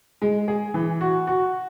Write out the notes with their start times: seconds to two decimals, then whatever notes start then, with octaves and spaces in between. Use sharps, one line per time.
0.22 G#3
0.48 G#4
0.74 E3
1.01 F#4
1.27 F#4